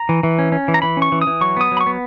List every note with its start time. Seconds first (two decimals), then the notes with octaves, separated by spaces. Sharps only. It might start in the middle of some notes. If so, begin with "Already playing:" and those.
Already playing: A#5
0.09 E3
0.23 E3
0.39 C#4
0.52 C#4
0.68 E3
0.74 A#5
0.82 E3 B5
0.97 C#4
1.02 C#6
1.12 E3
1.22 D#6
1.27 E3
1.41 F#3 C#6
1.57 B3 D#6
1.72 F#3
1.77 B5
1.81 C#6
1.87 B3